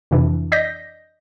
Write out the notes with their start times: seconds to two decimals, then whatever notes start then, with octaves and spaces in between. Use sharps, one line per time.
0.11 F2 C3 E3 D4
0.52 D5 D#5 G6 A#6 B6